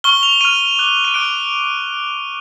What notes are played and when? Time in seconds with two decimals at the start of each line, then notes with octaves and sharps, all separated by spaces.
0.04 C#6 F6 G7
0.23 F7
0.41 C#6 F6 D#7
0.78 D6 F#6
1.05 D#7
1.14 D6 F#6 D7